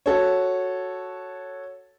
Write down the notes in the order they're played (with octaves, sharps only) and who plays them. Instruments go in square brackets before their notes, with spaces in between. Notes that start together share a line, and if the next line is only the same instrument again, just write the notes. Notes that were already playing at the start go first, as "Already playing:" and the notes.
[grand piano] F#4 A4 C#5